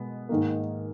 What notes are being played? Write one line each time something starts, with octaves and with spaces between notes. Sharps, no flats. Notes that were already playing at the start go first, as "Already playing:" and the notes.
Already playing: B2 G#3 B3
G#2 D#3 A#3